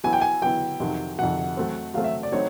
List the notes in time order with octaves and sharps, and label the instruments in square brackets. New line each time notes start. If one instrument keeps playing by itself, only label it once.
[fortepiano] F#3 B3 E4 [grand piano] G#5
[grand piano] G5
G#5
[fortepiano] F#3 B3 E4 [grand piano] G5
[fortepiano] F2 C3 D#3 F#3
[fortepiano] F2 C3 D#3 F#3 [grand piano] F#5
[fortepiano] F#3 A3 C4
[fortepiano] F#3 A3 C4 [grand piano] F5
[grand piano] E5
D5
[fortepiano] F#3 A3 C4 D#4 [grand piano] C#5